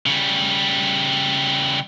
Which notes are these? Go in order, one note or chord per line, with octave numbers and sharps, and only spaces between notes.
C#3 G3